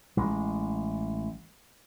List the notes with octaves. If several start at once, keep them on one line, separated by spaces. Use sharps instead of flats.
A1 G#3